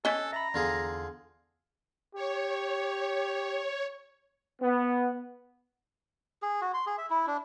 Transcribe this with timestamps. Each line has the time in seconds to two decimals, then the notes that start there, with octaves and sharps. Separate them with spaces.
0.05 C#4 A4 D#5 G#5 F#6 G#6
0.33 E5 A#5 B5
0.54 E2 D3 F4 G#4
2.15 G4 C#5
4.62 B3
6.42 G#4
6.61 F#4
6.74 C6
6.86 G#4
6.98 E5
7.10 E4
7.27 D4